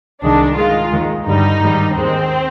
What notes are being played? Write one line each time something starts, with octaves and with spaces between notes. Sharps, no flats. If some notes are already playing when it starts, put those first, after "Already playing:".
C2 C3 D#3 G#3 D4
G#2 D#3 G#3 F4
D#2 D#3 G#3
G2 D3 G3 D#4
G#2 D#3 G3
D#2 D#3 G#3 C4